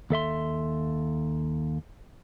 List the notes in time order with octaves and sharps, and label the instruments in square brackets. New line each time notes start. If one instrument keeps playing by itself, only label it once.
[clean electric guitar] D#2 A4 E5 C6